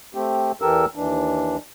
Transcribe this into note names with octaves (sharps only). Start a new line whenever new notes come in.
A3 C4 G4
E2 E3 G4 A4 A#4 E6
D#2 E3 D4